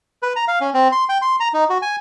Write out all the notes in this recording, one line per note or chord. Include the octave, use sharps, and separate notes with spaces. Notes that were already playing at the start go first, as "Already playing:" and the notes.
B4
A#5
F5
C#4
C4
C6
G5
C6
A#5
D#4
F#4
G#5